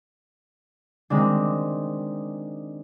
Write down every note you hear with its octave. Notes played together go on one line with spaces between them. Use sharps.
D#3 G#3 C4 D4